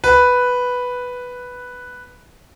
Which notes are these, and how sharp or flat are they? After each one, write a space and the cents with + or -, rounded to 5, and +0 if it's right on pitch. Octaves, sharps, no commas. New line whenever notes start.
B4 +0